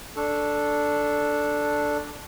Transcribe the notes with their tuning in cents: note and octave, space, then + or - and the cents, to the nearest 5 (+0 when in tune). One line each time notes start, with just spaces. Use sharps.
D4 +0 A4 +0 C#6 +0